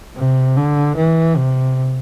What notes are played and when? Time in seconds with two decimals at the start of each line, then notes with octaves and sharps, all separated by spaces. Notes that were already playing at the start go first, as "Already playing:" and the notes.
0.16 C3
0.57 D3
0.96 E3
1.37 C3